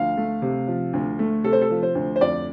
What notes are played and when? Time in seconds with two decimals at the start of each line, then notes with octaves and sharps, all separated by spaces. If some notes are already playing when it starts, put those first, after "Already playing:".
Already playing: D2 F3 F5
0.17 A3
0.42 C3
0.68 F3
0.93 D2
1.19 A3
1.44 C3 A4
1.53 C5
1.62 A4
1.70 F3
1.83 C5
1.95 D2
2.16 C5
2.21 F2 D5